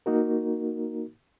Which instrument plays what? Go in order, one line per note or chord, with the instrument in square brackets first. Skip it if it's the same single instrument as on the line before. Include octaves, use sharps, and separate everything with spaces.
[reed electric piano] A#3 D#4 F#4 A#4